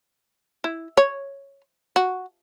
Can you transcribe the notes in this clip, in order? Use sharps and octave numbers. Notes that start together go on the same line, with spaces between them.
E4
C#5
F#4